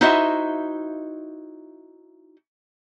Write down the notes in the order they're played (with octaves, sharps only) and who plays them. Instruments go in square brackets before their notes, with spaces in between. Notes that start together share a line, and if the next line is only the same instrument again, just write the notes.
[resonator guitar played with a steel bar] D#4 E4 F#4 C5 D#5 E5